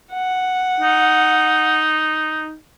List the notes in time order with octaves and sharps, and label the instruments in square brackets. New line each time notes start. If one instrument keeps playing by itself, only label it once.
[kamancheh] F#5
[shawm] D#4